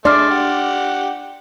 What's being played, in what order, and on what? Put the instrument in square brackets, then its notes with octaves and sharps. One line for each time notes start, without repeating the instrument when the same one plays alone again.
[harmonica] G#3 A3 [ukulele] D4 [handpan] D5 [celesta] C6 F6
[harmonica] G4 F#5